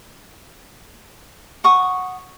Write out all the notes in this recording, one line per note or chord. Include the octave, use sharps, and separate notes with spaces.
F#5 C#6 D#6